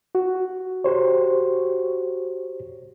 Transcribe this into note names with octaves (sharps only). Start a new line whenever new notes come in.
F#4
G4 C5 C#5